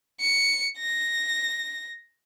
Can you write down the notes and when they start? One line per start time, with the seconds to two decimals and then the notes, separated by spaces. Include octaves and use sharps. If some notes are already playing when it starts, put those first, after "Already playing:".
0.21 C#7
0.79 A#6